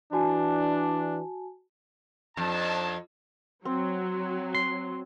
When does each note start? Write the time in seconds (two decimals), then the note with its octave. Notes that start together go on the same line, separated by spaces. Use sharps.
0.13 E3 D4 F#4 G#5 A5
2.37 F2 D4 D#4 A5
3.65 F#3 C4
4.55 C6